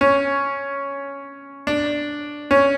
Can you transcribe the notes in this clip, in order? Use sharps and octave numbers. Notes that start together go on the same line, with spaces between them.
C#4
D4
C#4